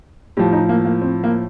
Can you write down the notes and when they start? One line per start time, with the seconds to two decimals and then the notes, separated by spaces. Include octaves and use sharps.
0.37 A2 F3 G4
0.53 D#4
0.69 A#3
0.85 A#3
1.02 C4
1.24 A#3